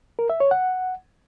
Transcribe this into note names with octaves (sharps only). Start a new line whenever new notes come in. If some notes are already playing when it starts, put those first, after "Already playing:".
A#4
E5
C#5
F#5